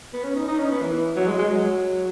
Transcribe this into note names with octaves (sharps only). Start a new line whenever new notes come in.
B3
C#4
D#4
D#4
C#4
B3
E3
F#3
G#3
G#3
F#3